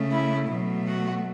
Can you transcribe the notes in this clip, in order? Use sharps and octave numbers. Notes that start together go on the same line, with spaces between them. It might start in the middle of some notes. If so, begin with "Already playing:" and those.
Already playing: C#3 A3
E4
B2 F#3 A3
F#4